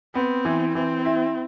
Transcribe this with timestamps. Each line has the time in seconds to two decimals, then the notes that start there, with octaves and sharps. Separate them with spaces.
0.15 B3 C4
0.45 E3
0.75 E3 C4
1.05 E4